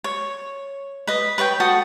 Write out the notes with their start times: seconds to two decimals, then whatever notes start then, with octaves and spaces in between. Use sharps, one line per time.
0.04 C#5
1.07 B4 D#5
1.38 B4 C#5 E5 G5
1.60 F#4 A4 D#6